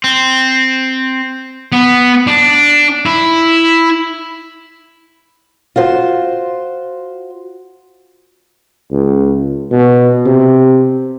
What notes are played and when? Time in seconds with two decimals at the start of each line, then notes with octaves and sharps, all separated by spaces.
0.04 C4
1.72 B3
2.27 D4
3.06 E4
5.76 F4 F#4 C5
8.92 C#2
9.71 B2
10.26 C3